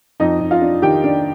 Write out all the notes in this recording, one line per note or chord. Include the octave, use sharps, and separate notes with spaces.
F2 D#4 D#5
F2
F4 F5
D4
D#3 G4 G5
D4